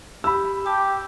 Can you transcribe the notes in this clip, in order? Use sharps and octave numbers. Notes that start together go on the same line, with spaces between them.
G4 B5 E6
G4 A5